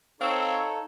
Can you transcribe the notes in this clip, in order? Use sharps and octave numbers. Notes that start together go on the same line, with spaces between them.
C4 D#4 A4 C#5 F5 E6